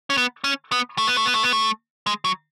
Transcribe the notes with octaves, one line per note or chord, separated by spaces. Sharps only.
C#4
B3
C#4
B3
A3
B3
A3
B3
A3
B3
A3
G#3
F#3